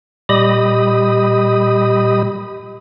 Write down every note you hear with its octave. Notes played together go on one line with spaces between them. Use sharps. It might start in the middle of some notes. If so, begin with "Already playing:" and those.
A#2 G3 G4 D#5 B5 D#6